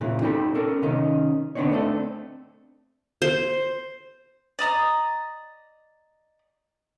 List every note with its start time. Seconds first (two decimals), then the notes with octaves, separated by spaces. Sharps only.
0.01 A#2 C#3 E3
0.21 C4 D#4 G4 A4 G5 B5
0.55 C#4 A4 A#4
0.82 C3 D#3 C#4 D#4
1.55 D3 B3 C4 D4 D#4 C#5
1.71 A3 C4 D4 A4
3.22 C5
4.59 D5 D#5 A#5 D#6